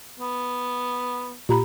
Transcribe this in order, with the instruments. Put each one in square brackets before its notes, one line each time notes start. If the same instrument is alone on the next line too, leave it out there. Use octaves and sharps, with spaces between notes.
[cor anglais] B3
[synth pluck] A#2 [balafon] G4 A#5 B5